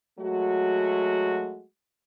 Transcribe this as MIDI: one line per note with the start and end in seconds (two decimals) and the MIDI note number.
0.19 1.64 54
0.19 1.64 56
0.19 1.64 57
0.19 1.64 66